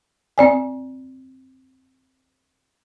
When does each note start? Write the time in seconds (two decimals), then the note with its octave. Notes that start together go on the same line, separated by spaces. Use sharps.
0.38 C4 D5 G#5